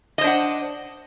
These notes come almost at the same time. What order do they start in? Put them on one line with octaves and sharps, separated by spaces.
D#5 C5 D4 F#5